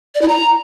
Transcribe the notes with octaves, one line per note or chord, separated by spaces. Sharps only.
D5
E4
A#5